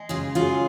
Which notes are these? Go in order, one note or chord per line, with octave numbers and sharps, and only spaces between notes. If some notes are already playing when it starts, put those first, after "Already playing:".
Already playing: G#3
C#3 F4 G#4
F#3 F4 G#4